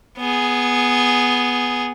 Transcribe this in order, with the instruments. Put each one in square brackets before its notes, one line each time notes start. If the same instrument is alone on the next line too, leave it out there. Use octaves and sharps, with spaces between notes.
[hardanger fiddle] B3 G#4